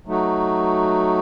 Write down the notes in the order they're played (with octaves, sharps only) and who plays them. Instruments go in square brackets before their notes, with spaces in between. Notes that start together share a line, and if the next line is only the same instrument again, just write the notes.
[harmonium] F#3 A3 D#4 F#4